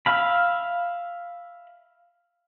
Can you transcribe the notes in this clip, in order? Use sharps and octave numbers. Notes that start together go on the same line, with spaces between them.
E5 F5 B5